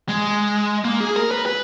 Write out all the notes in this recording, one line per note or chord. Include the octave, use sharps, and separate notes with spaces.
G#3
A#3
G#4
A#4
B4
B4